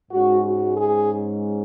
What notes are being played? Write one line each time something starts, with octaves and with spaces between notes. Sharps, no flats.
G#2 G#3 C#4 F#4
F#4
G#4